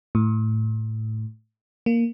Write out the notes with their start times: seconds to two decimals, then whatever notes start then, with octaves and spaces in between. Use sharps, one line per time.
0.15 A2
1.86 A#3